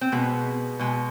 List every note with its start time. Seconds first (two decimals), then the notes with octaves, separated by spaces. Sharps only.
0.01 C4
0.12 B2 G#3 B3
0.79 B2 G#3